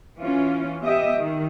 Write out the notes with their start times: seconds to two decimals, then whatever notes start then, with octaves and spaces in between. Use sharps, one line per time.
0.19 E3 C#4 F4
0.82 B3 G4 D#5 E5
1.17 D#3